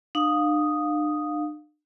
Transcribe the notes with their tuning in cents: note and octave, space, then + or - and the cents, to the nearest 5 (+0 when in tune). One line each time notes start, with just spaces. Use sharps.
D4 +40 F5 +20 D#6 +0